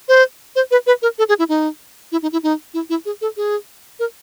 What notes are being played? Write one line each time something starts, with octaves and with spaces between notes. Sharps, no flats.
C5
C5
B4
B4
A#4
A4
G#4
E4
D#4
E4
D#4
E4
D#4
E4
E4
G#4
A4
G#4
A#4